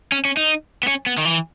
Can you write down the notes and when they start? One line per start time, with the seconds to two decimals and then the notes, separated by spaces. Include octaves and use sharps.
0.12 C#4
0.25 C#4
0.37 D#4
0.83 B3
0.88 C#4
1.06 B3
1.18 D#3
1.25 E3